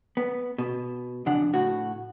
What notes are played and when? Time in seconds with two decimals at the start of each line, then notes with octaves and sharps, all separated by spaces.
0.17 B3
0.58 B2
1.26 F2 C#3 D4 F#5
1.54 A2 F#4